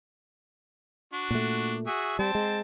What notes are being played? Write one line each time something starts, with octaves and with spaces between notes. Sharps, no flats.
D4 F#4
A#2 A3
F#4 G#4 E5
G3 C4 A5
G#3